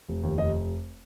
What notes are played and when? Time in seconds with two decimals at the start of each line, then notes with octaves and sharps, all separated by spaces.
0.09 F1
0.23 D#2
0.38 F1 D#5